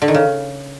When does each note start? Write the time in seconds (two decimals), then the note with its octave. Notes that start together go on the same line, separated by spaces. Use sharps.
0.02 D3
0.08 D#3
0.14 C#3